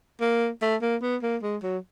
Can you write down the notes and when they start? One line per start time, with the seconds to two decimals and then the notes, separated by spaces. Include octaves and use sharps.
0.21 A#3
0.62 A3
0.82 A#3
1.02 B3
1.23 A#3
1.43 G#3
1.63 F#3